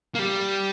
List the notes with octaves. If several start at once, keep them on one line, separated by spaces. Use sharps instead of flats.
A#3
G3